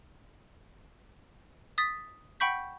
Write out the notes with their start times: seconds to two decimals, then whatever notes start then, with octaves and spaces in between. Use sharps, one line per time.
1.78 D#6 A6 B6
2.40 F#5 G5 B5 C#6 G6 B6